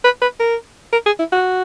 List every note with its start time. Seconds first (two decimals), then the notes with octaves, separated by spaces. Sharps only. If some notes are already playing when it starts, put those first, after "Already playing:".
0.04 B4
0.22 B4
0.40 A#4
0.92 A#4
1.06 G#4
1.19 E4
1.32 F#4